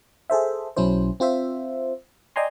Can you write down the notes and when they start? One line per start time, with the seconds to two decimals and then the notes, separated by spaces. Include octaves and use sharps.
0.30 G#4 A4 C5 E5
0.77 B1 F#3 C#4 E4 C5
1.20 C4 F4 C5 E5
2.36 D5 D#5 G5 G#5 A#5 C6